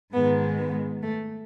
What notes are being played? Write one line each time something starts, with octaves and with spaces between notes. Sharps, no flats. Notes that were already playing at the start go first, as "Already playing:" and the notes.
G#2 D#3 G#3 B3
B3
A3